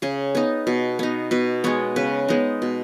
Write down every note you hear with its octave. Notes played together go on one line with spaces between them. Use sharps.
C#3 G#4
B3 D#4
B2
B3 D#4
B2 B4
G#3 B3 C#5
C#3 B4
G#3 B3 D#4
B2